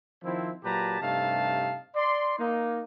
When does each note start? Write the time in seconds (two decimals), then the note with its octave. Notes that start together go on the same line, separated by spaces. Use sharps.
0.24 D#3 F3 C4 E4
0.64 A#2 F#3 G4 B4 A5 A#5
1.01 G2 C3 A3 D#4 F5 A5
1.96 D5 C6
2.38 A#3 D#4